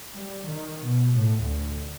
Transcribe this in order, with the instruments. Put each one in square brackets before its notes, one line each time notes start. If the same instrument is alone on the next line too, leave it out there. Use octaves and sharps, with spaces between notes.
[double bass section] G3
D#3
B2
A2
D2